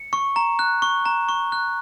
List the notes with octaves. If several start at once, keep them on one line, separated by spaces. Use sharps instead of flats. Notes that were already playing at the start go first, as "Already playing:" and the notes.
Already playing: C#7
C#6
A#5
F#6
C#6
A#5
C#6
F#6